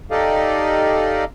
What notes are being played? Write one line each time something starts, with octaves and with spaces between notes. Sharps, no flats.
D#4 G4 A4 D5 D#5 F5